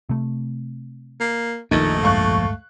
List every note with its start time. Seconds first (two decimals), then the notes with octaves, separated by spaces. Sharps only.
0.09 C3 A3
1.20 A#3
1.71 A#1 F2 D#3 A3
2.03 D1 G2 G#3 F5 C#6 F#6